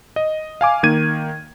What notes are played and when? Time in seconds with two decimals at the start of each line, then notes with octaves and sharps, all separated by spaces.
0.16 D#5
0.61 F5 G#5 D6
0.83 D#3 A#3 G#6 D#7